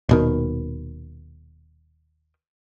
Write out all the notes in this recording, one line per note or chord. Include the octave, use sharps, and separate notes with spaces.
D#1 B2 D#3